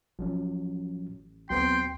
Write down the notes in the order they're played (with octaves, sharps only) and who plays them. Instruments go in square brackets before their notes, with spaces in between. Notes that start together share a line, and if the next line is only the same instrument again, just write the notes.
[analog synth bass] A1 [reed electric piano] F3 F#3 C#4
[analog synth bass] D#2 [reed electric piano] F#3 B3 C4 [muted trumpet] G5 [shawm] C6